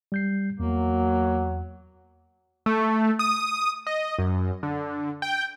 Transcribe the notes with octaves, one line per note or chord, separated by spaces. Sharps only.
G3 G6 C7
E2 F#3 A#3
A3
D#6
D#5
F#2
D3
G5